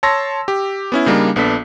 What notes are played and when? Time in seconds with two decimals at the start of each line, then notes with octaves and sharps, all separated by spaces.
0.03 C#5 A5 C6 E6 A#6
0.48 G4
0.92 B3 C#4 E4
1.06 C#3 G3 A#3 D4 D#4
1.36 A#1 B3 D4 A4 B6